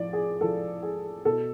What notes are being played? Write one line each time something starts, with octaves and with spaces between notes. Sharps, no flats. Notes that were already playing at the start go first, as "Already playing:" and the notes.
Already playing: A2 F3 D5
G#4
A2 F3 A4
G#4
B2 A4